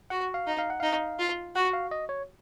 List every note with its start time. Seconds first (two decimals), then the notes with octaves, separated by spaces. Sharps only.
0.10 F#4 F#5
0.34 F5
0.47 D#4
0.59 F5
0.70 F#5
0.80 D#4 F5
1.19 F4
1.55 F#4 F#5
1.73 F5
1.91 D#5
2.09 C#5